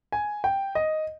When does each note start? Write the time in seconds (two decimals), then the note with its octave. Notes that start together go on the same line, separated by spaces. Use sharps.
0.12 G#5
0.44 G5
0.75 D#5